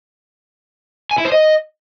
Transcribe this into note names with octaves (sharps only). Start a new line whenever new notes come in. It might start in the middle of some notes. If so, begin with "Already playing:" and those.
G#5
E4
C5
D#5